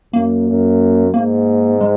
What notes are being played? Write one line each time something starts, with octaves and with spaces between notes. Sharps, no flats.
F#2 A#3
F#2
G#2 A#3
G#3